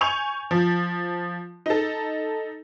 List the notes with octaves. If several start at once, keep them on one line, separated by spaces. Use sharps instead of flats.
G#5 C#6 G6 F7
F3
D#4 A4